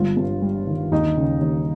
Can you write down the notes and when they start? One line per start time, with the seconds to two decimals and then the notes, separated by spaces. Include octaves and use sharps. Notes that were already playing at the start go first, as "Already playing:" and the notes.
Already playing: G1 G3 F4
0.17 G2
0.42 G3
0.67 D#3
0.91 D#2 D#4
1.17 C#3
1.41 D#2